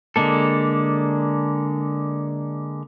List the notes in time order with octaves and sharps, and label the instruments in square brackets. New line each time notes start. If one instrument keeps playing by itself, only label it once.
[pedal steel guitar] D3 G#3 A#3 A4